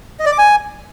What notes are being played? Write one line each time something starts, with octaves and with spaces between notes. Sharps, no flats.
D#5
D5
D6
G#5